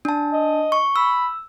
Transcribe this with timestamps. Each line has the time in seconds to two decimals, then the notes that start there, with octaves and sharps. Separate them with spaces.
0.05 D4 A5
0.32 D#5
0.72 C#6
0.96 B5 E6